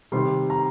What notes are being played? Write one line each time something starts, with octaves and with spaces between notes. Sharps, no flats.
C3 D#3 G3 C6
A#5